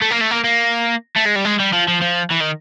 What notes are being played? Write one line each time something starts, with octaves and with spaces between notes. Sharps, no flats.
A3
A#3
A3
A#3
A#3
A3
G#3
G3
G#3
G3
F3
F3
F3
E3
D#3